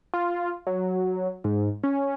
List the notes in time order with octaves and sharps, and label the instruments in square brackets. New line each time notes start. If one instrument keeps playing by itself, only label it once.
[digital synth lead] F4
F#3
G#2
C#4